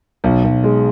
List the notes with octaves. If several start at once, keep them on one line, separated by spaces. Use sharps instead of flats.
B1
B1
G#3